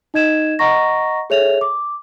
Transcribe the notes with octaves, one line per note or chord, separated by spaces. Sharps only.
D#4 D#5 G#6 E7
D#5 F#5 A#5 C#6 A#6
G#4 A4 C#5 E5 F7
D6